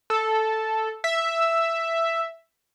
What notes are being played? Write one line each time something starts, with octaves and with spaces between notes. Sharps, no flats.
A4
E5